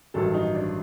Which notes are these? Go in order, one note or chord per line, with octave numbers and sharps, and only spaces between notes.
A1 G2 D#3 F#3 A4
D#4
D4